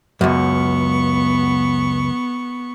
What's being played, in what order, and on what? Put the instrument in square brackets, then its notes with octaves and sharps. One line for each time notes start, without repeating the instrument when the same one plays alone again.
[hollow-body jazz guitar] C#2 F#2 [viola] B3 C#6